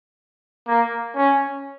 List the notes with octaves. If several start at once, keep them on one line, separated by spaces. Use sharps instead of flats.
A#3
C#4